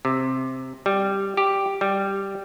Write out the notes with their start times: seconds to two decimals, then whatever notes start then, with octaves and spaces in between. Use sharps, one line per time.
0.05 C3
0.86 G3
1.37 G4
1.81 G3